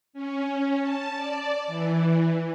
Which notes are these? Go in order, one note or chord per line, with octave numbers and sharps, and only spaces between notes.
C#4
A5
D5
E3